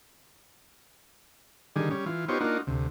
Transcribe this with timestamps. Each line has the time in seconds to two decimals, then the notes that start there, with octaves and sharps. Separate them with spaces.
1.76 D3 D#3 G3 G#4
1.91 G3 C#4
2.06 E3 F4
2.28 B3 D#4 F4 G4 C5 C#5
2.41 A#3 D4 D#4 F4 F#4
2.67 D2 C3